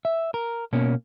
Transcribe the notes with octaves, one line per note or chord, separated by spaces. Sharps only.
E5
A#4
B2 A#3 C#4